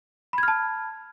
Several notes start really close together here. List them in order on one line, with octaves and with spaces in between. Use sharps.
B5 G#6 F6 A5